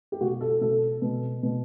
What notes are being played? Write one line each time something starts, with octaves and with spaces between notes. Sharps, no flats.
G4
B2 F#4
A4
B2 A4
B2
B2